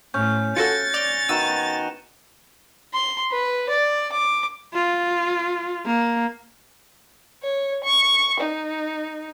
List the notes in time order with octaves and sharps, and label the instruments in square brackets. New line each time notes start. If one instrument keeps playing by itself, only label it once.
[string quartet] A2 [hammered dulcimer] C#4 [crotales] G6
[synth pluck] F4 F#4 A4 [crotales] F#6 A#6 C#7 [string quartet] A6
[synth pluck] D5 [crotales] F7 G7
[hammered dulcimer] D#3 B3 F#4 [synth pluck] E6 [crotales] D#7 E7
[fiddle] C6
B4
D5
D6
[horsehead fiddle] F4
A#3
[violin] C#5
C#6
D#4